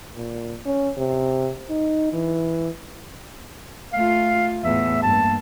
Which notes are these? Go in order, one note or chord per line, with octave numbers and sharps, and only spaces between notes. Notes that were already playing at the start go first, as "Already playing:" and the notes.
A#2
C#4
C3
D#4
E3
A3 F4 F5
E2 A2 E5
G2 A#3 A5